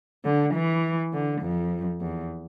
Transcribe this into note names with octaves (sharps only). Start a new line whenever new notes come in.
D3
E3
D3
F2
E2